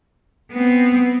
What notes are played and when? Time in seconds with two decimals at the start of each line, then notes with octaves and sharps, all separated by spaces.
0.52 B3 C4